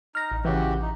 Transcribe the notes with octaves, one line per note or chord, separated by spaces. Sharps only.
D#4 F6 A#6
A1
C#3 E3 F#4 G4
D#4